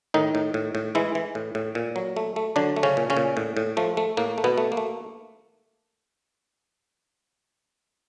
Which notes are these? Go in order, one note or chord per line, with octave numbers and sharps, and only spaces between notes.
A2 D#3 D#4
A2
A2
A2
E3 G#3 E4
E3
A2
A2
A#2
F#3
A3
A3
D3 F#3 D4
A3
C#3 C#4
A#2
C#3 C#4
A#2
A2
A2
F3 A3
A3
A2 A#3
A3
B2 B3
A3
A#3
A3